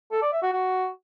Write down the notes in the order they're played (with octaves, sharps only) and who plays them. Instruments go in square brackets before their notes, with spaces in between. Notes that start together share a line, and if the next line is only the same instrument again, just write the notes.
[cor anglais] A4
D5
E5
F#4
F#4